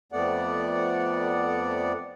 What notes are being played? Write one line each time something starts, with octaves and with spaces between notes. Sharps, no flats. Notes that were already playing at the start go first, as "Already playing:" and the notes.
F2 A3 B3 D5 F#5